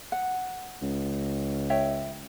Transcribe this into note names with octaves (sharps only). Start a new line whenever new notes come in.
F#5
C#2
C#5 E5 G5